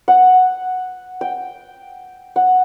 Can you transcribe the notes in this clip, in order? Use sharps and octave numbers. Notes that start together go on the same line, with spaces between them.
F#5
G5
F#5